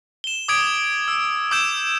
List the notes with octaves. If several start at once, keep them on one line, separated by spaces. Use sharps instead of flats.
E7 G7
D6 D#6 G#6 D7
E6
D6 E6 G6 E7